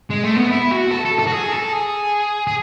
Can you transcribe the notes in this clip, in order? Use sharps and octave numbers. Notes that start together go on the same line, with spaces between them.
G#3
A3
B3
E4
F#4
A4
A4
A4
F#4
G#4
A4
G#4
G#4